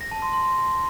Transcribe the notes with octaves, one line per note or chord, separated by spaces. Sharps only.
A#6
A5
C6
C6